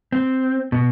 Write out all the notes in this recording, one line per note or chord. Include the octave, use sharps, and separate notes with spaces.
C4
B2